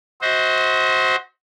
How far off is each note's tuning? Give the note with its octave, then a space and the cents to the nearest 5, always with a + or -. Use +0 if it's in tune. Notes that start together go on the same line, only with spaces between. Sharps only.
F#4 +0 C5 +0 D#5 +45